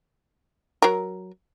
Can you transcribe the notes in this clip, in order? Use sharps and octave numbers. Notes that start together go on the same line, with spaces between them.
F#3 A#4